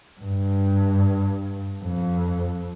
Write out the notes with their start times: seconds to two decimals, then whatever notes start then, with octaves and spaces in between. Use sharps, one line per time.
0.20 G2
1.84 F2